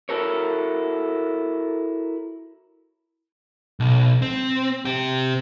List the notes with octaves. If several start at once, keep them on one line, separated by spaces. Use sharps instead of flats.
E4 F#4 A4 A#4 C#5
B1
C4
C4 G4